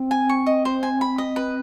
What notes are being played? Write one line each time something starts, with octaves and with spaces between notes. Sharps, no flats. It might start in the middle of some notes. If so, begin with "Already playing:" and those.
Already playing: C4
G#5
C#6
D#5
C5
G#5
B5
D#5
B4